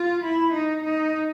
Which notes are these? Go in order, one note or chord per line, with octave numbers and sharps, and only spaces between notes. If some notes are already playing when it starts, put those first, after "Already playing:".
Already playing: F4
E4
D#4
D#4